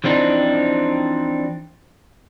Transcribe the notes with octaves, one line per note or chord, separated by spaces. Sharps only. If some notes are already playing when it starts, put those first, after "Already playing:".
E3 F3 C4 D4 D#4